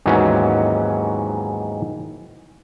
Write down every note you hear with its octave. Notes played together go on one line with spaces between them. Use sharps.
D#2 G#2 E3 F#3 B3 C#4